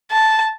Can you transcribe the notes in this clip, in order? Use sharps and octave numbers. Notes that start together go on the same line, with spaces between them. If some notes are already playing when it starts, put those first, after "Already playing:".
A5